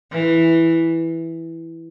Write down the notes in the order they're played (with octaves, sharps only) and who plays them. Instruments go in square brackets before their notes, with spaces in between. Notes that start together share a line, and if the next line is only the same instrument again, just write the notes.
[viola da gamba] E3